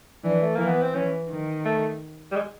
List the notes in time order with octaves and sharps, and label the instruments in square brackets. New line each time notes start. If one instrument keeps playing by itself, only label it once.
[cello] E3 [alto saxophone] D4
[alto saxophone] A3
[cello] E3 [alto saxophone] A#3
[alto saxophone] B3
C4
[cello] E3 [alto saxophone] C#4
[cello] D#3
[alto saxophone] A3
G3
G#3